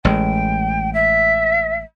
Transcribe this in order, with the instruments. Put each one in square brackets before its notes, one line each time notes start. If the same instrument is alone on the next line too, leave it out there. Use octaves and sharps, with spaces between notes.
[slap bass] A1 G#3 [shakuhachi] G5
[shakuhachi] E5